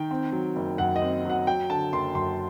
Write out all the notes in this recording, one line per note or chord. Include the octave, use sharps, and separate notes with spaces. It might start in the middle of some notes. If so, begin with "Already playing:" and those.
Already playing: D#3 G5
C4
F#3
F#1
F#2 F#5
D#5
C4
F#3 F#5
F#3 G5
D3 A5
F#1 C6
F#2 C6